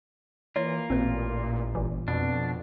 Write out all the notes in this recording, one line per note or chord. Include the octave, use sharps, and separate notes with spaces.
E3 A#3 F4 C#5
A1 A#2 C4 B4
G1 A#2 E3
F2 B2 D4